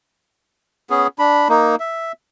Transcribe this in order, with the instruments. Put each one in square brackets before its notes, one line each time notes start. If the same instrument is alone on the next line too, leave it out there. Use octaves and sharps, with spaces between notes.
[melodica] B3 C#4 G#4
D4 B5
A#3 D#4
E5